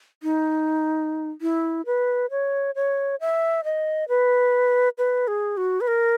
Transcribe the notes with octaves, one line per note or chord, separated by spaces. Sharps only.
D#4
E4
B4
C#5
C#5
E5
D#5
B4
B4
G#4
F#4
B4
A#4